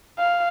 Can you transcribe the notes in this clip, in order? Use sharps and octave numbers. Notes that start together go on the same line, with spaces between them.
F5